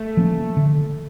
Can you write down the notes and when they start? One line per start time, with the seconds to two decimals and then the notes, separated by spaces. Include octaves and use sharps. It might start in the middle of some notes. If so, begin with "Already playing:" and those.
Already playing: A3
0.17 F3 A#3 C#4
0.57 D3